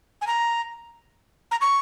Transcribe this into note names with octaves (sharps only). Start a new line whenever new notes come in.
G#5
A#5
A#5
C#6